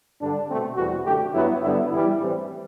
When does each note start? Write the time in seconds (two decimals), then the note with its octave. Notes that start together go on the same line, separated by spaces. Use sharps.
0.20 G2 D3 G3 D4
0.48 B2 A3 C4
0.76 E2 B2 G3 C4 F#4
1.05 F#2 D3 A3 G4
1.33 G2 F#3 B3 E4
1.62 G2 D3 G3 B3 E4
1.90 G2 E3 G3 E4
2.19 A2 E3 G3 C4